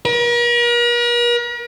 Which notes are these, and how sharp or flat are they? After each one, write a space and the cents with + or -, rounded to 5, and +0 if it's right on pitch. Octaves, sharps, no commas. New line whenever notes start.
A#4 +45